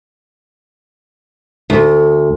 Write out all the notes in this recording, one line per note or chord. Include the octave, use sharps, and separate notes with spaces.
D2